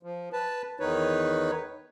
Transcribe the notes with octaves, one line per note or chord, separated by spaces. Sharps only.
F3
B4 A5
E2 D#3 D#4 B4 C#5